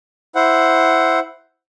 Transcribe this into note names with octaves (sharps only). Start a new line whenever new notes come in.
E4 C5 F#5